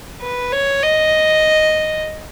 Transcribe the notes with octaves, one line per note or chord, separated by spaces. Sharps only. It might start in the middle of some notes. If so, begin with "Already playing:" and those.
B4
C#5
D#5